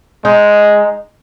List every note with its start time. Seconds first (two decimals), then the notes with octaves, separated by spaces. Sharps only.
0.25 G#3 D#4